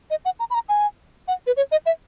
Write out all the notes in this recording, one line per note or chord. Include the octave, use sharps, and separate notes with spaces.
D#5
F#5
A#5
B5
A#5
G#5
F#5
B4
C#5
D#5
E5